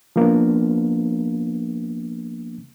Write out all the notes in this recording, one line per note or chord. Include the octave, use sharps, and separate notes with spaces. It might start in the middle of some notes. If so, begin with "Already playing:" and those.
F3 A#3 B3 D4